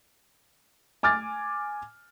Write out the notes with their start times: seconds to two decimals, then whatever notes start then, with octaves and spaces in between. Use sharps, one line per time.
1.03 G#5 D6 F6 A6